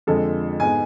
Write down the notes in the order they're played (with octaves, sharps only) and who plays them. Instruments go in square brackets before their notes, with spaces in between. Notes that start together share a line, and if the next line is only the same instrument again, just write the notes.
[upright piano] F2 D3 F3 G#3 A4
G#2 G#3 B3 G#5